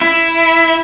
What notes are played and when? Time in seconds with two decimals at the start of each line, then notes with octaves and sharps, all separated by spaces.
0.01 E4